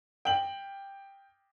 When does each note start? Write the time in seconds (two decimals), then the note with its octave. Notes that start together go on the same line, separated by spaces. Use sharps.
0.25 G5 F#7